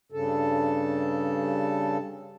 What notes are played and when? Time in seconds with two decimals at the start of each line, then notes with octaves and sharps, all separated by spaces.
0.12 G2 C#3 A4